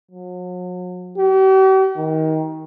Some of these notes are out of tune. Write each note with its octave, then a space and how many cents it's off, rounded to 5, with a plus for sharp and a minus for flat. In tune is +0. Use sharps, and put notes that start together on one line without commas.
F#3 -40
G4 -45
D#3 +25